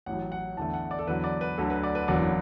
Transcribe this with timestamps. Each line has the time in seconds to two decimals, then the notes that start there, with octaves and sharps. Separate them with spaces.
0.06 A1 A2 F#3 F#5
0.32 F#5
0.57 E2 D3 A3 A5
0.74 F#5
0.91 D5
0.99 A4
1.07 E2 D3 F#3 B4
1.24 D5
1.41 B4
1.57 D2 D3 F#3 A4
1.70 B4
1.83 D5
1.95 B4
2.08 F#1 E2 D3 F#3 B3 D5